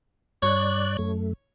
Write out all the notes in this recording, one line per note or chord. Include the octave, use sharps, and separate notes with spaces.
G2 C#5 D5 F#6
F#2 A3